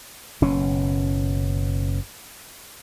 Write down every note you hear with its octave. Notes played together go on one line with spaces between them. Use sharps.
F#1 B2 C#4